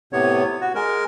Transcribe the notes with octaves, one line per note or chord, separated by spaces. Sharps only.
A2 C3 B3 C#5
F#4
G#3 A#4